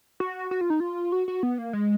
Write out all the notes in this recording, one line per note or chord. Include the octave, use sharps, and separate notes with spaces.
F#4
F#4
F4
D#4
F4
F#4
F#4
B3
A#3
G#3